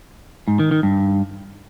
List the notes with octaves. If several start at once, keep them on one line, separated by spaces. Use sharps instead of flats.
G#2
D#3
D#3
G2